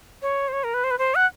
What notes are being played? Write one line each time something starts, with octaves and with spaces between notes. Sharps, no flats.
C#5
C5
C#5
A#4
B4
C5
B4
C5
F#5